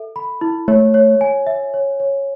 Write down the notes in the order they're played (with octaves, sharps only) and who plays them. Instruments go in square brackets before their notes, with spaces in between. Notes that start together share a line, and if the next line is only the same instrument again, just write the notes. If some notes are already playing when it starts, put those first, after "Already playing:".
Already playing: [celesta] A4 E5
B5
E4
[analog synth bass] A3 [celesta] C#5
[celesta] C#5
G#5
E5
C#5
C#5